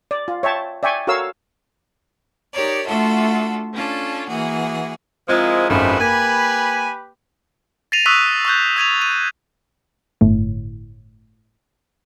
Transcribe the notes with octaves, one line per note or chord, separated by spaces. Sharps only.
D5
F4
C#5 E5 G5 A5
D5 E5 G5 G#5 C#6
F#4 A4 A#4 C#5 F5 E6
D#4 G4 A#4 C#5 D5
A3 D4 F4 F#4 A4 E5
C#4 D4 F4 A4
E3 A#3 F#4 G#4
F3 G#3 C4 E4 F4 A#4 D#5
G#1 F#2 F3 G#3 A3 G4 B4 B5
A#3 G#5
A6 A#6 C7 D#7 F7
C#6 D#6 E6 F#6 B6 D#7
C#6 E6 F#6 G6
D#6 G#6 D#7 F7
D#7
G1 A2